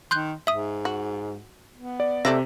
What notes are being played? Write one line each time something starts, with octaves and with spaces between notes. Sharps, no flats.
D#3 C6 F#6 G6
G#2 E5 D#6
F#4
B3
D5
C3 A3 D5 E5 A#6